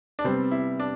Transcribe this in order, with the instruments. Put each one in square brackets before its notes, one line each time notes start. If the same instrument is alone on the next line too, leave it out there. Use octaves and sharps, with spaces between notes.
[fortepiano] D4
[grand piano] C3 G3 B3 [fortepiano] C4
[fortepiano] E4
D4